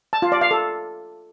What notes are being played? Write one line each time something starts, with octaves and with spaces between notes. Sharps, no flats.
A5
F4
D5
F5
A4